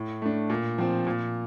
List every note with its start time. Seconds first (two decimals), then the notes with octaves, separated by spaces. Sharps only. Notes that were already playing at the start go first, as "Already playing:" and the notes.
Already playing: A2
0.22 A3 D4
0.50 A#2
0.78 F3 C4
1.07 A#2